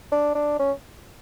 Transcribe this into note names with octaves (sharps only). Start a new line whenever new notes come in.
D4
D4
C#4